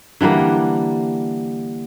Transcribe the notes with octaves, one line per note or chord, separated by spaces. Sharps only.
D3 E3 G3 A#3